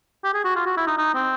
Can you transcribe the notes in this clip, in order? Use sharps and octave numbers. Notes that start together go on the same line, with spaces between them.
G4
G#4
F#4
F4
F#4
E4
D#4
D#4
C4